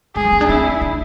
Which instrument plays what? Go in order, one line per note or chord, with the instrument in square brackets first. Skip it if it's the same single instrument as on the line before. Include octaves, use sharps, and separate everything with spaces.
[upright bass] G#3 [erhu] G#4
[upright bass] F3
C4
D4
[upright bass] C4 [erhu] E4
[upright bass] D4